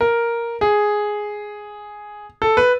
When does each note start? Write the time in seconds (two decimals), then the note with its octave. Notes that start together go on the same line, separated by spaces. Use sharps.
0.01 A#4
0.61 G#4
2.42 A4
2.57 B4